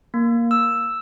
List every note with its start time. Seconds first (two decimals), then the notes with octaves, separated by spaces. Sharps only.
0.14 A#3
0.51 E6